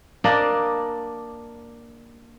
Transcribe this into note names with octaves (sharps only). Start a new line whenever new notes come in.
A#3 D4 D5 D#5